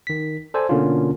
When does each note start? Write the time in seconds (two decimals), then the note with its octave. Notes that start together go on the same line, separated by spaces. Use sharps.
0.07 D#3 B6
0.54 A4 C5 D5 G#5
0.69 B2 D3 A#3 C#4 D4 F4